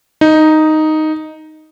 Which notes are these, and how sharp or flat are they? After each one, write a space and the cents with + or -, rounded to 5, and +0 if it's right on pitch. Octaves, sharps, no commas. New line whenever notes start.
D#4 +0